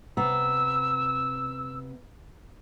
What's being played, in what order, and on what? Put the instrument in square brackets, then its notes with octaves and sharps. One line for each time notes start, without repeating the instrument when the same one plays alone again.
[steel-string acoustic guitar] C3 B3 A#5 [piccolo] E6